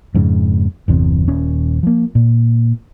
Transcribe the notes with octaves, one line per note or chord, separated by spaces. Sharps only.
F2 G#2 C#3
G1 E2 C3
D#1 C#4
F3 A#3
A#2